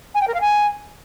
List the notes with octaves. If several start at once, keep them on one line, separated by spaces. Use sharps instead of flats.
G#5
G5
A#4
F5
G#5